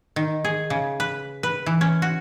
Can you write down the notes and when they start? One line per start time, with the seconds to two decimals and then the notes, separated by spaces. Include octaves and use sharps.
0.16 D#3
0.44 G#4
0.70 C#3
1.00 B4
1.43 B4
1.66 E3
1.81 C#4
2.02 F#4